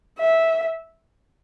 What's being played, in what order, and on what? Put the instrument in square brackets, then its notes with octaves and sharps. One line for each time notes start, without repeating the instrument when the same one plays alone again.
[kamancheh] E5